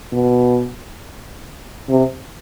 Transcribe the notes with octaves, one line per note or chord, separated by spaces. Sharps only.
B2
C3